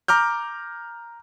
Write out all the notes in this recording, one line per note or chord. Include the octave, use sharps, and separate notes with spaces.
A#5 D6 F6 G6